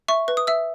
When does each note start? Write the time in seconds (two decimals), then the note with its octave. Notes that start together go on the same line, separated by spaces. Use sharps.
0.08 E5 C#6
0.28 B4
0.37 D#6
0.47 E5 E6